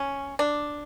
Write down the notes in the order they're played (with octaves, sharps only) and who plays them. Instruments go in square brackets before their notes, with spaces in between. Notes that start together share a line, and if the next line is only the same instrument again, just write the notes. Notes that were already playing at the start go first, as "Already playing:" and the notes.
Already playing: [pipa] C#4
D4